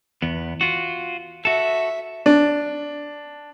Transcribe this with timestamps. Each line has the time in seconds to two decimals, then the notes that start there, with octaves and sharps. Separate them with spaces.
0.22 E2 B3
0.61 F4 F#4
1.45 F#4 A4 E5
2.26 D4